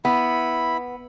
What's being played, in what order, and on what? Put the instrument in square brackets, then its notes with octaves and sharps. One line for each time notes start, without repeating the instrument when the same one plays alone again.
[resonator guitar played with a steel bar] B3 [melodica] E4 B5